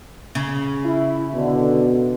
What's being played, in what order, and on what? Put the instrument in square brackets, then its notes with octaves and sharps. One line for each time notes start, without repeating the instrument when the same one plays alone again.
[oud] C#3
[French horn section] E4
[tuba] B2 [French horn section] D3